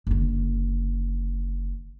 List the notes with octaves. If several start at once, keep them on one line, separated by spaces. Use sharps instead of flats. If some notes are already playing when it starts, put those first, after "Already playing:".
F#1 D3